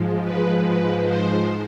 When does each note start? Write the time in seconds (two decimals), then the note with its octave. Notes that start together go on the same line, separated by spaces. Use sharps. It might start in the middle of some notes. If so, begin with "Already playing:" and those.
Already playing: G#2 F3 G#3
0.24 B4
0.64 G#2 F3 G#3 B4
1.05 C5